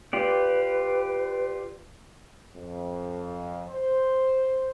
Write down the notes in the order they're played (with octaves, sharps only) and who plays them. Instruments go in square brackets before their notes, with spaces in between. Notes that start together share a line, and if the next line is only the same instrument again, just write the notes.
[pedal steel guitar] F4 G4 D5 [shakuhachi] B4
[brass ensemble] F2
C5